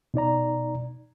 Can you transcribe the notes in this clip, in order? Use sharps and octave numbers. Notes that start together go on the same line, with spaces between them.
B2 D#4 D5 A#5